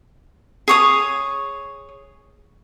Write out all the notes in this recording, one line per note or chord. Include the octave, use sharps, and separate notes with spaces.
G#4 C#5 D#6